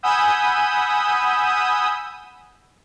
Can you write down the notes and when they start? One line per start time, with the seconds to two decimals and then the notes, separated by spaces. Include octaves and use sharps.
0.03 F#5 G#5 B5 D#6 E6 G6